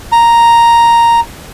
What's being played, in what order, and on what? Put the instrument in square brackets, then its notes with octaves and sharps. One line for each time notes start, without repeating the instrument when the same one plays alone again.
[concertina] A#5